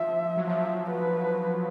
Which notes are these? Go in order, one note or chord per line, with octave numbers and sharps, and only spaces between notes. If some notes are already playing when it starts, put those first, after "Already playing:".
Already playing: F3 E5
F#3
F3 E5
B4